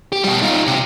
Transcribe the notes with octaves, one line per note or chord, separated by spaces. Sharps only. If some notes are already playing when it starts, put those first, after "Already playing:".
G4
B2 G3
D#4 F4
C3